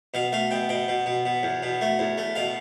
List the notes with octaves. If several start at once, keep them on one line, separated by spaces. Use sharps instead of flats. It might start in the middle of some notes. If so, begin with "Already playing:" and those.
B2 F5
A3 F5
B2 G5
B2 G5
B2
B2
B2
E2
B2
A3
E2
A3
B2 F5